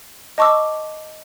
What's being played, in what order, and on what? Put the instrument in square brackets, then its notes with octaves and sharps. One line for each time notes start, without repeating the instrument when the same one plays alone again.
[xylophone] D#5 A5 C#6 D6 E6